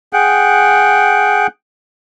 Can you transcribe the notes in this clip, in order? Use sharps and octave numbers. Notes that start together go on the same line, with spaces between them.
G#4 F#5 G5